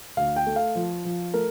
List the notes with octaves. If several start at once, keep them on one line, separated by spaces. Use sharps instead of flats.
D2 F5
G5
A3
F5
F3
F3
A3 A#4